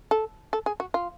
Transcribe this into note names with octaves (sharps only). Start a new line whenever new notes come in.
A4
A4
G#4
F#4
F4